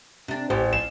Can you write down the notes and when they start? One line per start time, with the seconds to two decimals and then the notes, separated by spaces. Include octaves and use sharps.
0.28 C3 D4
0.50 A1 G4 C5
0.73 F3 E7